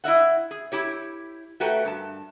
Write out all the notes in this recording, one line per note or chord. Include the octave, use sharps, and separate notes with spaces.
E4 D#5 E5 F#5
G#4
E4 G4 C#5
A3 F#4 G4 A#4 B4 G5
G2 A5